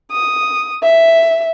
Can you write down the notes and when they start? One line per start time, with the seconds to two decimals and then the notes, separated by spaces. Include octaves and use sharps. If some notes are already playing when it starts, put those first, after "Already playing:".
0.11 D#6
0.83 E5